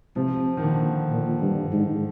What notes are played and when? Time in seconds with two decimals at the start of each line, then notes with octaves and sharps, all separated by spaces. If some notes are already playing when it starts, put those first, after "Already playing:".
0.16 C3 F3
0.57 D#3
0.63 A#2 D3
1.10 A#2
1.42 G2
1.72 G#2